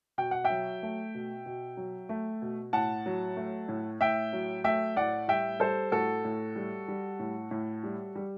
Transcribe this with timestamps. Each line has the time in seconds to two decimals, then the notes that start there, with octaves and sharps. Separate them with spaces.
0.18 B2 G5
0.31 F#5
0.44 E5 G5
0.50 F#3
0.83 A3
1.15 B2
1.46 B2
1.77 F#3
2.09 A3
2.42 B2
2.73 A2 F#5 A5
3.06 F#3
3.37 A3
3.68 A2
4.01 A2 E5 G5
4.33 F#3
4.64 A3 E5 G5
4.96 A2 D5 F#5
5.28 G3 E5 G5
5.60 G3 A4 C5
5.92 A2 F#4 A4
6.24 A2
6.56 G3
6.88 G3
7.19 A2
7.51 A2
7.84 G3
8.15 G3